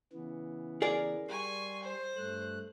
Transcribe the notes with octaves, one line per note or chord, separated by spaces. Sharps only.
C#3 E3 B3
G#4 A#4 D5
G3 G#5 C6 C#6
C5
G2 A3 F#6